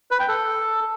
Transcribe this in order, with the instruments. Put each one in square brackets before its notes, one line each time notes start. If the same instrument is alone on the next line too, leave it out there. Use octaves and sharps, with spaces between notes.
[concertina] B4
G5
A4